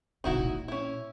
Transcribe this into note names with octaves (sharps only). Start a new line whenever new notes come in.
D2 C3 D#4 E4 F#4
A#2
C#4 E4